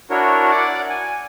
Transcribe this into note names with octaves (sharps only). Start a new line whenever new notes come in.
D4 E4 F#4 A#4 C#5
D5 F#5 D6
G#5